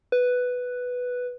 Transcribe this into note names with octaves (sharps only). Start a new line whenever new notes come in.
B4